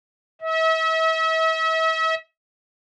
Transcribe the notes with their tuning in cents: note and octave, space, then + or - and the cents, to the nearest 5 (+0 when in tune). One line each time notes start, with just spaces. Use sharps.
E5 -40